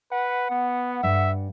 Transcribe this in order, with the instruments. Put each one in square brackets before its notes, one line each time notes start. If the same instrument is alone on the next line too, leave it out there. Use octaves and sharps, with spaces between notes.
[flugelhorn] B4 [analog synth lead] F#5
[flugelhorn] B3
[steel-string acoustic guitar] G2 [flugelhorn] E5